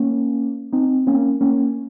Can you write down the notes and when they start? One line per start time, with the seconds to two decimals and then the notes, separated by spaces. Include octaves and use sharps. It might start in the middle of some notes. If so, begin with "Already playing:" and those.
Already playing: A#3 C#4
0.73 C4 D#4
1.07 A#3 C#4
1.41 A#3 C#4